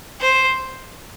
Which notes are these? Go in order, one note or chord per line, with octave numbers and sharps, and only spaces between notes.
C5